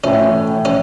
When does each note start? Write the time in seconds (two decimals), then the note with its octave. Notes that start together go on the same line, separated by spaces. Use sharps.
0.04 A2 E3 A3 C#4
0.65 C#4